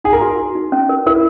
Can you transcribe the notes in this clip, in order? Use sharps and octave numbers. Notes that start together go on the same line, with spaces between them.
D#4 G#4
A#4
F#4
F#4
D#4
C#4
A#4
E4 A#4